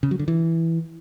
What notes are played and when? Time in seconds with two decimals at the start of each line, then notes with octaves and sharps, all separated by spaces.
0.03 C#3
0.11 F#3
0.19 D3
0.28 E3